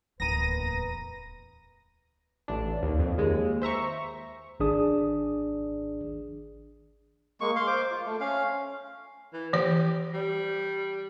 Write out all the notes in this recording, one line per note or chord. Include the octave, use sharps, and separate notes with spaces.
D1 E2 A#3 D#4 B4 A#5 A#6 D#7
A1 D4
D#2
F2
D#2 G#3
C5 E5 A#5 C#6
G#1 D#3 D4 G#4 D5 D#6
G#3 A#3 C#6
F5 C6
C5 D6
F4
A3
C#4 F5
E3
E3 G4 C5
G3